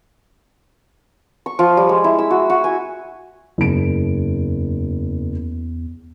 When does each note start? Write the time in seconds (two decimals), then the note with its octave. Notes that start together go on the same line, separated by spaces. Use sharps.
1.46 C#6
1.59 F3
1.77 G3
1.89 G#3
2.04 E4
2.19 E6
2.31 F#4
2.50 F#4
2.64 G#5
3.58 F#1 E2 D7